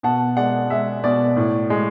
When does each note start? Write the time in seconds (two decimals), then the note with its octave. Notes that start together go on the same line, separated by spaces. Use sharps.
0.03 B2 F#5 A5
0.37 G#3 D5 F#5
0.70 G#3 E5
1.04 B2 D5
1.37 A2
1.70 G#3